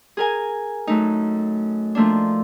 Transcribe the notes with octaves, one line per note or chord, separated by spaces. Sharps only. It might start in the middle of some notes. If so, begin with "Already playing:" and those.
G#4 A#4 G#5
F#2 A3 D#4
F3 A3 A#3 D4